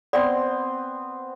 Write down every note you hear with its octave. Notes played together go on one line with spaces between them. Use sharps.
B3 C4 D5 C6